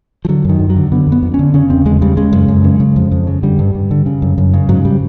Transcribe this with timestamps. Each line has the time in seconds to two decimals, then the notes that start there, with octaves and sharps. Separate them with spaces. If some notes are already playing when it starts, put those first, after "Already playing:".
0.25 F3
0.29 D3 F#3
0.45 F#2 D#3
0.60 F#2
0.70 F#3
0.76 D3
0.92 D3 B3
1.07 F2
1.12 B3
1.23 F2
1.34 C#4
1.39 D3
1.54 C#3 C#4
1.70 E2 C4
1.85 E2 G#3
2.01 C#3 G3
2.17 C#3 G#3
2.33 F#2
2.48 F#2
2.64 C#3
2.80 C#3
2.96 F2
3.11 F2
3.27 C#3
3.43 D3 G3
3.59 G2
3.75 G2
3.91 D3
4.06 C#3
4.22 F#2
4.38 F#2
4.54 C#3
4.69 G#2 F#3
4.85 G3